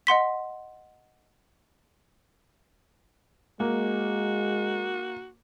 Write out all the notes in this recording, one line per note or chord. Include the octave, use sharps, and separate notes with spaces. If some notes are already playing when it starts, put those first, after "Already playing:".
D#5 F#5 C6 B6
G#3 A#3 F#4